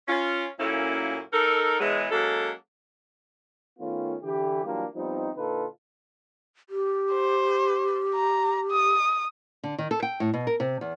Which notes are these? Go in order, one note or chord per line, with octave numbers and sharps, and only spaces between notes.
C#4 F4
F#2 A#2 A3 A#3 C#4 E4
D#4 A4 A#4
B2 E3 F#3 G#3
F#3 G#3 A#3 C#4 A4
D#3 A3 B3 C#4 F4
D3 E3 G4
E3 F#3 G3 A#3 D4 F4
F3 G3 B3 C4 D#4
A#2 D3 D#4 F4 A4 B4
G4
C5
A#5
D#6
D3
D#3
A4
G5
A2
B2
A#4
C3
E2